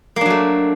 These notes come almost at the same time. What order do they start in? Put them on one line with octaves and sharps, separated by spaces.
A#3 D4 F#3 A3